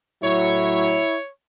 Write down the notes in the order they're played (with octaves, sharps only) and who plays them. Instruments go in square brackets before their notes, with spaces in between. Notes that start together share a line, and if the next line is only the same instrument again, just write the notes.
[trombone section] A2 F#3 [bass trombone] E4 [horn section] C#5